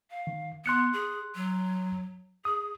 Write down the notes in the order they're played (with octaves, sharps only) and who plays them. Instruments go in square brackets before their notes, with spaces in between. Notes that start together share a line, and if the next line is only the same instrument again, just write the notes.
[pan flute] F5
[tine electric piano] D#3
[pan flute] B3 [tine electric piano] C6 F#6 C#7
[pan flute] G#4
F#3
[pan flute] G#4 [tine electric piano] D#6